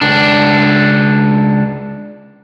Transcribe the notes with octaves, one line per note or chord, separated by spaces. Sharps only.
C#2 D4